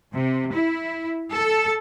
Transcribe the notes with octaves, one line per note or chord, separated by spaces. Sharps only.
C3
E4
A4